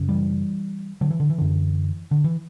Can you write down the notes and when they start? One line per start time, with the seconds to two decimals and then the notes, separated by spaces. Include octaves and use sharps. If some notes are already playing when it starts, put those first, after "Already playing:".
Already playing: F#2 C#3
0.08 E3 G3
1.01 D3 F#3
1.11 E3
1.20 D3
1.29 E3
1.38 F#2 D3
2.11 D3
2.24 E3